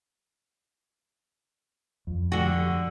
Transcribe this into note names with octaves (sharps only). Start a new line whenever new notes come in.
F2
D3 F#4